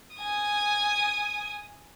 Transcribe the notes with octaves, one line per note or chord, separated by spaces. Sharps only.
G#5 D#6